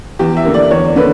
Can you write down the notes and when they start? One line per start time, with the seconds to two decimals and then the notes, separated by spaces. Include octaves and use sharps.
0.19 E2 G4
0.37 E5
0.45 D3 A#3
0.54 D5
0.70 E2 C#5
0.96 D3 A#3 B4